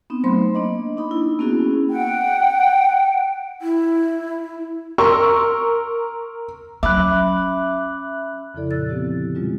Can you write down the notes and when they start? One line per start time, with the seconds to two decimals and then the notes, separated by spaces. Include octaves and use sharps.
0.10 B3 C4 D#4
0.24 F#3 A3 B3 C5 B5 C6
0.55 A#3 D4 D#5
0.97 D4 D#4 B5
1.11 E4
1.39 A#3 B3 C#4 E4 F#4 G#4
1.90 F#5 G5
3.62 E4
4.98 A#4 C6 C#6 E6
6.83 F#3 C#4 E5 B5 D6 F#6
8.54 F2 C#3 F3 E4 A4 D5
8.71 A#2 C#3 E6 F#6 A6
8.89 D3 F3 B3 C4 E4 G4
9.05 G4
9.35 B2 G3 G#3 C#4 F4